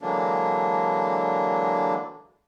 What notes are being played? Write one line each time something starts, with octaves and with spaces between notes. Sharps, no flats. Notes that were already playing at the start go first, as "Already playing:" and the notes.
D3 E3 F#3 G#3 A#3 D4